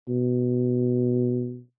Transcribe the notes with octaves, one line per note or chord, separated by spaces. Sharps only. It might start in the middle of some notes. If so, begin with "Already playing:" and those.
B2